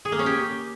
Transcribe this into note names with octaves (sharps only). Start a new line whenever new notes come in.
G#4
A#3
C#4
G4